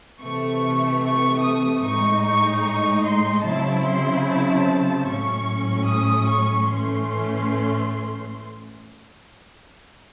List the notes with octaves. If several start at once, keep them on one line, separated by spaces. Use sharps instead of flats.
C3 E3 A3 C#6
C#6
D#6
A2 G#3 D#4 C#6
C#6
C#6
C6
C#3 F#3 C4 E4 A5
C6
A5
A2 F#3 C#4 C#6
D#6
C#6
A2 E3 A3 C#4 C6